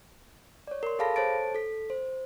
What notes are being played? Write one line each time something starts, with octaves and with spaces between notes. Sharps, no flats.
C#5 D5
A#4 C6
G#4 A4 F5 A5 B5 A#6
A4 C5 C#5 A5 A6 D7
A4 B6
C5